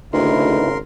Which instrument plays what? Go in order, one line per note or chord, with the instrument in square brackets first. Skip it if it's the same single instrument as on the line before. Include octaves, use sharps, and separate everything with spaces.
[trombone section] G#1 C#3 [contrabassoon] D2 [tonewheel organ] D#4 E4 B4 [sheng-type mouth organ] A#4 C6